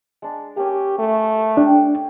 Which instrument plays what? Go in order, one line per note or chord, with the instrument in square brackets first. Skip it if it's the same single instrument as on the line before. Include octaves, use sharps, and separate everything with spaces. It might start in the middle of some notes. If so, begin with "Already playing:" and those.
[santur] G#3 D4
[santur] A#3 C#4 G#5 [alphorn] G4
[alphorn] A3
[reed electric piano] D4 [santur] G4 G5